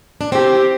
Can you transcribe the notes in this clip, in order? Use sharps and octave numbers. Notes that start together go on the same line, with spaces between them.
D4
C4 G4